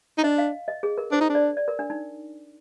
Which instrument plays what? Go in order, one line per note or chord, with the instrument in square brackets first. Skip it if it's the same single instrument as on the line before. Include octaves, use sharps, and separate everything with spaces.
[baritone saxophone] D#4
[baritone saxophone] D4 [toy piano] D#5
[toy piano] F5
D#5
G#4
A#4
[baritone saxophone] D4 [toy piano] C5
[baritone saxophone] D#4
D4
[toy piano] D5
D5
A#4
D4
D#4